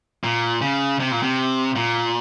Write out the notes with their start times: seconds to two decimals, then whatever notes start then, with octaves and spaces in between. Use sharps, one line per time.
0.24 A#2
0.62 C#3
1.00 C3
1.12 A#2
1.23 C3
1.76 A#2